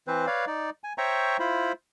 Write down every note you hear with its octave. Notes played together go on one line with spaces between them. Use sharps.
E3 C4 B4 C5
B4 C#5 D5 F5
D#4 D5
G#5
C5 C#5 E5 G5 A#5 C#6
E4 F4 C5 B5